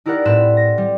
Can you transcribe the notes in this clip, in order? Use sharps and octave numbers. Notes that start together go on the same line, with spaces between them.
D#4 E4 G4 A#4 D5 F#5
A2 C4 B4 C6 E7
A#6
G3